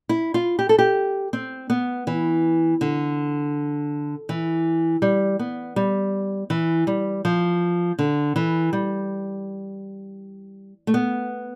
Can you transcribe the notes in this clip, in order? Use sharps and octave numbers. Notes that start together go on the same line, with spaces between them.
E4
F4
G4
A4
G4
C4
B3
E3
D3
E3
G3
B3
G3
E3
G3
F3
D3
E3
G3
A3
B3